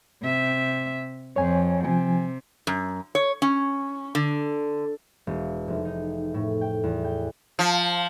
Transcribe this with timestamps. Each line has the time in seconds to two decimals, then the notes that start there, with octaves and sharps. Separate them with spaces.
0.22 C3 E5
1.36 F2 C#5 G#5
1.85 C3 F3 G#5
2.67 F#2
3.15 C#5
3.42 C#4
4.15 D3
5.27 E1
5.68 F1
5.85 D#4
6.34 A2
6.61 G5
6.84 E2
7.04 G5
7.59 F3